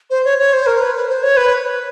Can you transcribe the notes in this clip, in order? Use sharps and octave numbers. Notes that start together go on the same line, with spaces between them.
C5
C#5
C#5
C5
A#4
B4
B4
C5
C#5
B4